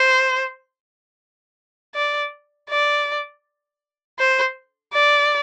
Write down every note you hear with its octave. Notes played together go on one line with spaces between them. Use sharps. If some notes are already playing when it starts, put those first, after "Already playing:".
Already playing: C5
D5
D5
C5
D5